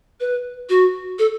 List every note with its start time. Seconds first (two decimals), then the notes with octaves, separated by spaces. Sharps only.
0.20 B4
0.69 F#4
1.19 A4